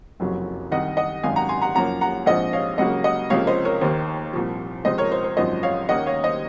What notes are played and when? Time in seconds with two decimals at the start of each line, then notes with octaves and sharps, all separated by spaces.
0.20 F#1 F2 C3 F#3
0.71 C2 C3 D#3 D#5 F#5
0.97 D#5 F#5
1.23 G#1 F#2 D#3 F5 G#5
1.36 F#5 A#5
1.49 G#5 C6
1.62 F#5 A#5
1.75 F#2 F3 A#3 C#4 F#5 A#5
2.01 F#5 A#5
2.26 A#1 G#2 F3 C4 D#5 F#5
2.53 C#5 F5
2.78 C#2 C#3 F#3 A#3 D#5 F#5
3.04 D#5 F#5
3.30 C#2 C3 F3 A#3 C#4 C#5 F5
3.47 C5 D#5
3.65 A#4 C#5
3.81 D#2 D#3 A#3 C5
4.33 C2 A#2 F3
4.85 C#2 C3 F3 C5 D#5
4.98 A#4 C#5
5.12 C5
5.24 C5
5.37 G#1 F#2 F3 C5 D#5
5.63 C#5 F5
5.89 D#2 D#3 A#3 C#4 D#5 F#5
6.06 C#5 F5
6.23 C5 D#5